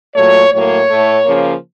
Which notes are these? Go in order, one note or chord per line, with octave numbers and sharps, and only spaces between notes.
A#2 F#3 A3 C#5
A2 F#3 A#3 C#5
A2 A3
C#3 F3 A#3